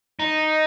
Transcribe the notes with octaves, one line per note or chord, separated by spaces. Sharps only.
D#4